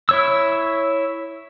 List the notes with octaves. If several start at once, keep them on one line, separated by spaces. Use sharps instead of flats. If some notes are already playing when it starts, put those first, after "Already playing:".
E4 C#5 E6